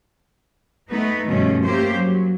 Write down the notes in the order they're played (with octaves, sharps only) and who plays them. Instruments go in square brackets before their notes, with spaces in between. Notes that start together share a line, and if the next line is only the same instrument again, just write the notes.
[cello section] A3 B3 D#4 B4
G2 B2 D#3 F3 A3 C#4
A3 A#3 C#4 G4 C5
F#3